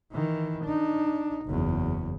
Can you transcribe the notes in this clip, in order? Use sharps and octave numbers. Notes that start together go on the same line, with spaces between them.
D#3 E3
D4 D#4
F#1 E2